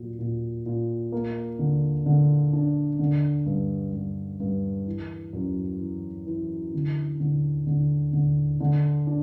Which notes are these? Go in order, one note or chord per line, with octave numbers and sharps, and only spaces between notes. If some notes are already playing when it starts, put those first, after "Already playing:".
Already playing: A#2 F#3
A#2
A#2
A#3
D3
D3
D4
D3
G2
G2
G2
E3
F#2
E3
E3
D3
D3
D3
D3
D3
D4